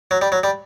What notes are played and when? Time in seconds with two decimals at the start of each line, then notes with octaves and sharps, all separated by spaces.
0.11 F#3
0.22 G3
0.32 F#3
0.43 G3